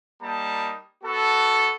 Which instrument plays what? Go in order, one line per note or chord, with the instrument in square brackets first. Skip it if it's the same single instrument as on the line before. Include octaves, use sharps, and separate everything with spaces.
[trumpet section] G3 A#3 D#4 A5
B3 F#4 A4